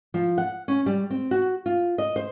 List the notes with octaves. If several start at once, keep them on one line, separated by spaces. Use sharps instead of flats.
F3
F#5
C#4
G3
C4
F#4
F4
D#5
C5